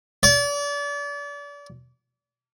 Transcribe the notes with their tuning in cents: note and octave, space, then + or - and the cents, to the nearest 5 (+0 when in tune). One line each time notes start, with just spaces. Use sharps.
D5 -35